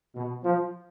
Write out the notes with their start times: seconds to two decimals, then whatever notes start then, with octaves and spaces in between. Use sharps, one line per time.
0.15 B2
0.44 F3